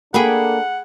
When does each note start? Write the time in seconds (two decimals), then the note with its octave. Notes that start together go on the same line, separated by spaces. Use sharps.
0.14 A#3 D4 G#4 A4 F#5 G5 B5